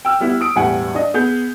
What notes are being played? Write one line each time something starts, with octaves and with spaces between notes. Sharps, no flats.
G5 E6 F6
G3 B3 E4 G4
D#6 D7
E1 E2 A2 G3 F#5 G#5
D4 D#5
B3 G#4 G6